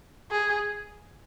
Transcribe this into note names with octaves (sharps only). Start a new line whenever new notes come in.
G#4